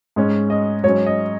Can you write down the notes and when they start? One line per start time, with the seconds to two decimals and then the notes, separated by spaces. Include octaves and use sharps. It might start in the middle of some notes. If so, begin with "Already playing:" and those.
0.16 G#2 G#3 C#4
0.50 D#5
0.84 G#2 F#3 C#4 C#5
1.06 D#5